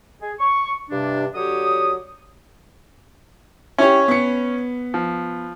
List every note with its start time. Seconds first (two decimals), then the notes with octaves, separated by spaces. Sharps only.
0.21 G#4
0.40 C#6
0.90 G2 C3 D4
1.34 D3 F#3 G4 C#5 D#6
3.78 C#4 E4 G4 C#5
4.08 B3 C#7
4.94 F3